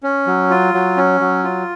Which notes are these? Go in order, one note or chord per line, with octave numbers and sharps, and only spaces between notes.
C#4
F#3
F4
F#3
C#4
F#3
F4